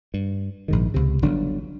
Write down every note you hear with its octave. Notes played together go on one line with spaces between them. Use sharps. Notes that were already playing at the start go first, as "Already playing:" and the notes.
G2
A#1 G#2 D#3
C#2 C3
G1 D3 F#3 D4